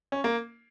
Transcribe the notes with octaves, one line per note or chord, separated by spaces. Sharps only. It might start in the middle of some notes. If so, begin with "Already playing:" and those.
C#4
A#3